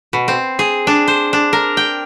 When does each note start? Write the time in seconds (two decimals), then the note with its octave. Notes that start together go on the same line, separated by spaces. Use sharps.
0.13 B2
0.28 C4
0.59 G#4
0.87 D4
1.08 C5
1.33 D4
1.53 A#4
1.77 G5